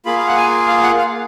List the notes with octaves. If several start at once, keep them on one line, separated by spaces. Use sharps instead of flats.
A#3 F4 G#4 B5
F5
F#5
G#5
F5
F#5
F5